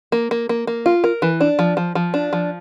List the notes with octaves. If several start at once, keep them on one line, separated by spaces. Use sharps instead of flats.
A#3
A#3
A#3
A#3
F4
A#4
E3
D4
F3
F3
F3
D4
F3